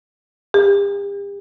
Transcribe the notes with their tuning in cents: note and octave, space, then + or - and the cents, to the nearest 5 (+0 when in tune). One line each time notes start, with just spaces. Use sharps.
G4 +40